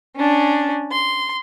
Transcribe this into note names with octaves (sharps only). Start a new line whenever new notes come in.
C#4 D4
C6